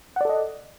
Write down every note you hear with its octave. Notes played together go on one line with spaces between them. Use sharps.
A4 D5 D#5 F#5